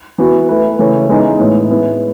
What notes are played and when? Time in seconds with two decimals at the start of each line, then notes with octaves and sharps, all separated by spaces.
0.18 E3 B3 F#4
0.49 A3 E4 B4
0.78 C#3 E3 A3 C#4
1.09 E3 G#3 B3 D#4
1.39 A2 E3 B3 E4
1.71 G#3 B3 E4